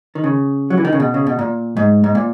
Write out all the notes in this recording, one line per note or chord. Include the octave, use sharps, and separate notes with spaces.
D#3
C#3
F#3
E3
D#3
C#3
B2
C#3
B2
A#2
G#2
G#2
A#2